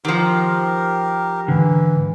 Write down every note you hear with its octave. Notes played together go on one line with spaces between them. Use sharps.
D#3 F3 G4 A#4
G#2 D3 E3